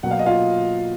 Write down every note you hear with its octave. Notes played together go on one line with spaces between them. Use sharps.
B2 F#3 A#3 F#5
F5
D#5
F4 F5